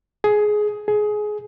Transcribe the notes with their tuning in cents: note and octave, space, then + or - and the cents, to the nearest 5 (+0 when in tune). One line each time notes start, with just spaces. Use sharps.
G#4 +15
G#4 +20